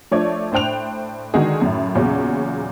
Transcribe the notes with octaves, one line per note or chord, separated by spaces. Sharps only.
F3 A3 D4 C#5 D5 G#6
A2 D4 C5 G5 F#6 F7
D3 D#3 G#3 D#4 F#4 G#4
F#2 A2
E2 A#2 C#3 F#3 C#4